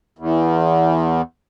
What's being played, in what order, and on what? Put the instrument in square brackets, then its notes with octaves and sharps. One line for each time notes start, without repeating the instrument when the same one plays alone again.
[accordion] E2